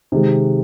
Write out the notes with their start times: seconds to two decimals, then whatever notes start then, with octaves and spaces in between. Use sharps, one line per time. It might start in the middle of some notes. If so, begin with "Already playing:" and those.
0.12 C3 D#3 G#3